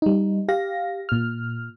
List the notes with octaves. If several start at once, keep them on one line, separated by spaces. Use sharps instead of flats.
G3 D#4
G4 F5 A#6
A#2 F6